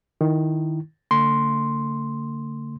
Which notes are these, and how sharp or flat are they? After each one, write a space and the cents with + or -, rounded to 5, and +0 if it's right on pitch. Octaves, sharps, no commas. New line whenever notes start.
D#3 +0 E4 +0
D3 -40 A3 +40 C6 +0